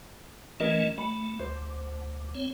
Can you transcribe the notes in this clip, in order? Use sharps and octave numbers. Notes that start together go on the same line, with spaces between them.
E3 A3 C#4 A#4 D#5
A3 B5
D2 C5
C4 C#5